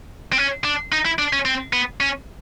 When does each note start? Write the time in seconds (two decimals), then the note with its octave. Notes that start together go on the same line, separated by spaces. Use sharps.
0.33 C4
0.38 C#4
0.64 D4
0.92 D#4
1.05 E4
1.19 D4
1.33 C#4
1.45 C4
1.73 B3
2.00 C#4